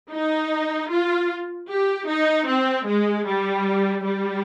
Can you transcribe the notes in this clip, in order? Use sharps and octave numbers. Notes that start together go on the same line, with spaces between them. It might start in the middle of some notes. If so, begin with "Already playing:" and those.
D#4
F4
G4
D#4
C4
G#3
G3
G3